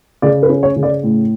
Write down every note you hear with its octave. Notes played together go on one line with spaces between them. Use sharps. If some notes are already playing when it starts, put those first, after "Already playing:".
C#3 D5
B4
C#4
C#5
C#3
D5
A2